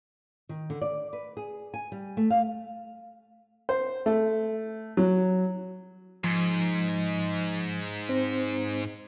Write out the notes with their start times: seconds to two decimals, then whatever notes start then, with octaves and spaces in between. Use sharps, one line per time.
0.49 D#3
0.70 D3
0.82 D5
1.13 B4
1.37 G#4
1.74 G#5
1.92 G3
2.17 A3
2.30 F5
3.69 C5
4.06 A3
4.97 F#3
6.24 G#2 F3
8.09 C4 C5